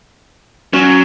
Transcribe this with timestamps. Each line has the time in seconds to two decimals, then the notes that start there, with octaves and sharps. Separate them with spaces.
0.73 F#3 C#4